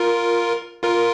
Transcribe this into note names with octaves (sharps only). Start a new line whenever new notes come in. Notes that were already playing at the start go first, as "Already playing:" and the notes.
Already playing: F4 A#4
F4 A#4